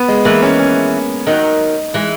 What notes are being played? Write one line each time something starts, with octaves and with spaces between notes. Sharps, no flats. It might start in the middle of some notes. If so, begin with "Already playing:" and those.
Already playing: B3
G#3
E3 G#3 A#3
C#4
C#4
D#3 F#3 D#4
E3 G#3